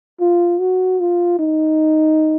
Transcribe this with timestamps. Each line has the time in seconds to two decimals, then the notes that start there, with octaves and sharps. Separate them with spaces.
0.20 F4
0.60 F#4
1.00 F4
1.39 D#4